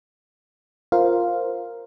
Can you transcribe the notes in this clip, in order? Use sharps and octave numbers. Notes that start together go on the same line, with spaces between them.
F4 A#4 C5 F5